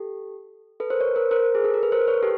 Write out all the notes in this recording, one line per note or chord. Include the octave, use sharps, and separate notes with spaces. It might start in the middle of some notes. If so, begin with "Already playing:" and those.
Already playing: G4 A4
A4 B4
A#4 C5
B4 C#5
A#4 C5
A#4 C5
G#4
A4
A#4
B4
A#4 C5
B4 C#5
G4 A4